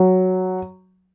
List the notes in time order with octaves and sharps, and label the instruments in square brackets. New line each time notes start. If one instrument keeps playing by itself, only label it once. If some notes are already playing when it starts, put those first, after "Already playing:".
Already playing: [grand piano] F#3